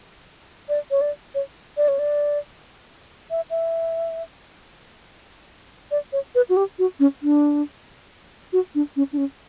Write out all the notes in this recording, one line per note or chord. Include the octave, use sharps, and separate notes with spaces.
D5
C#5
D5
C#5
D5
C#5
D5
E5
E5
D5
C#5
B4
F#4
G4
F#4
C#4
D4
F#4
D4
C#4
D4
C#4